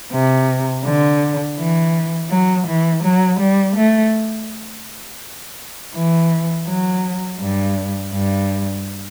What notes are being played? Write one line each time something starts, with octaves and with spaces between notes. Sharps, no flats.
C3
D3
E3
F#3
E3
F#3
G3
A3
E3
F#3
G2
G2